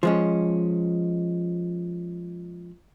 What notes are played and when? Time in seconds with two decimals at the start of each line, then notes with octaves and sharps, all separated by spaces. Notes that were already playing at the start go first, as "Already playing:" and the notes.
0.03 F3 G#3 C#4